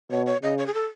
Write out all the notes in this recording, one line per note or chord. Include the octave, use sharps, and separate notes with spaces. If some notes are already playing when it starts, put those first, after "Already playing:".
B2 C#5
C#5
C#3 D#5
C#5
G#4
A4